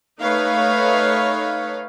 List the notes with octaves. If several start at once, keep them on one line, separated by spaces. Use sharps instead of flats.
A3 D#4 B4 C#5 F5